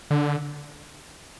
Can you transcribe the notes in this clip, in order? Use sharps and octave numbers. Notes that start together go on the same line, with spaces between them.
D3